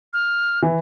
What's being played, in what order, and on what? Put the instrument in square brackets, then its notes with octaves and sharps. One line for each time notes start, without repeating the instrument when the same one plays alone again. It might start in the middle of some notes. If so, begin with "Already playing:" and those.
[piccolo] F6
[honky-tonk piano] E3